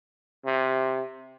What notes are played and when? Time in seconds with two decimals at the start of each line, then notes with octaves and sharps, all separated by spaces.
0.45 C3